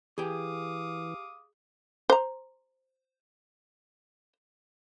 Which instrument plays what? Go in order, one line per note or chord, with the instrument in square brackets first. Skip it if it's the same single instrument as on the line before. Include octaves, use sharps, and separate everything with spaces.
[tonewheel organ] E3 [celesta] G4 G#5 [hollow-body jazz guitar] G#4 G5 [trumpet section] F5 D6 D#6
[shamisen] C5 A#5